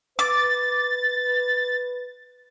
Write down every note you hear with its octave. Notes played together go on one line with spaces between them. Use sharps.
B4 D6 A6